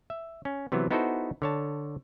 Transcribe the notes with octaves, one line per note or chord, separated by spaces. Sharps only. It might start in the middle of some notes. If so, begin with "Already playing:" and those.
E5
C#4
C3 E3 F#3 B3
B3 D#4 E4 F#4 A4 C5
D3 C#5 A5